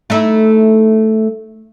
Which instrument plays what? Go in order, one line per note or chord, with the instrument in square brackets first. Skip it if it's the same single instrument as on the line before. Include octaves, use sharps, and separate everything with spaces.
[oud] A3 D#4 E4